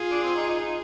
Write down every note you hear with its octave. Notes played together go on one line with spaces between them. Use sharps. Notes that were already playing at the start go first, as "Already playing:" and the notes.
Already playing: F4 G#4
D4
C4
D#4
D#4
D#4